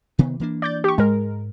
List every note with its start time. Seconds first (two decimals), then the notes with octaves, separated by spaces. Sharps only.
0.19 C3 D#3 B3
0.40 E3 A#3 D4
0.62 D5 G6 A6
0.84 G4 C#6
0.98 G#2 G#3 A#4